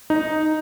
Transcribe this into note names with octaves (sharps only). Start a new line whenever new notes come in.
D#4